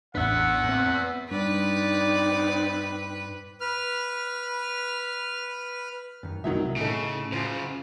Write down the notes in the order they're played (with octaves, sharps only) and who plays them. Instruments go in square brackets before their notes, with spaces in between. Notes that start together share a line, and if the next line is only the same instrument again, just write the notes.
[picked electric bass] A1 E2 D4 [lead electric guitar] B3 E5 [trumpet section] F#5
[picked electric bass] C4
[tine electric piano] G2 [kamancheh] C4 D#4 [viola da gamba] B4 [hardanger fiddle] D5
[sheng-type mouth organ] B4 F6
[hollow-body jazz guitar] F#2 D#3
[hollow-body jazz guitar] C2 B2 [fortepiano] D#3 F#3 E5
[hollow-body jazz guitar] A2 [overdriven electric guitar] C#3 [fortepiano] D#4 A4
[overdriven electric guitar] F#2 C#3 [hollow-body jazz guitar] F4 C5